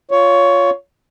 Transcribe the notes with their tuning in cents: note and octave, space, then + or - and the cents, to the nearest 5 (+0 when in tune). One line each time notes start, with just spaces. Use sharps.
F4 +5 C#5 +15